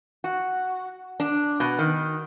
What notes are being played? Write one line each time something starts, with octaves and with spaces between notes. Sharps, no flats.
F#4
D4
B2
D#3